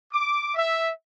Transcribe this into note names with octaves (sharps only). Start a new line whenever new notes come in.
D6
E5